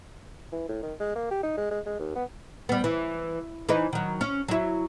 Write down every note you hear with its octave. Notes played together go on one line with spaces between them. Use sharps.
E3
A2
D#3
G#3
A#3
G4
D#4
G#3
G#3
G#3
D#2
B3
G3 B3
E3
E3 D#4 B4
D#3 F#3
C#4
F#3 E4